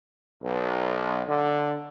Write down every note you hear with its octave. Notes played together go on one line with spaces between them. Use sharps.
B1
D3